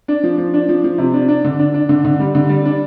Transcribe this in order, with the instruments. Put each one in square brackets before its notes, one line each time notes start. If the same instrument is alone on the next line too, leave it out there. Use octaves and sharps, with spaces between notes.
[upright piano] D4
F3
F3
D4
F3
F3
C3
D4
D4
D3
D4
D4
D3
D3
G3
D3
G3
D4